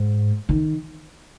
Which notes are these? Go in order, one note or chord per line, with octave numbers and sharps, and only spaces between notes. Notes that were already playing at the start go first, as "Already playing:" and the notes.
Already playing: G#2
D#3